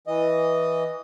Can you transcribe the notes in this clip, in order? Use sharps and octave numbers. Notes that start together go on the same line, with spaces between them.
E3 D#5